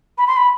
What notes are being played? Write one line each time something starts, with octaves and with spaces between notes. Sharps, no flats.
B5
C6
B5